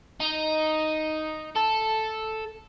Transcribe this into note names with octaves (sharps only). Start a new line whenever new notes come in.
D#4
A4